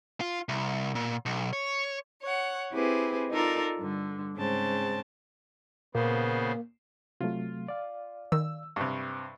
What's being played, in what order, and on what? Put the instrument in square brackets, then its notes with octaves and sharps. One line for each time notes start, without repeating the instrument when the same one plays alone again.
[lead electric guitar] F4
C2
A#2
B1
C#5
[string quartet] C#5 F#5
C4 E4 G4 G#4 B4
D#4 F4 A4 A#4 D5
G2 D3
G#2 C#3 C4 A5
[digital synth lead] A#2 [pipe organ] C#3 B3 C5 [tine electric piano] A#3
[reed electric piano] C3 F#3 A3 [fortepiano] F4
[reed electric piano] D5 F5
[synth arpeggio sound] D#3 [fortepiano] E6
[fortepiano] G2 C3 [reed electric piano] B5 C#6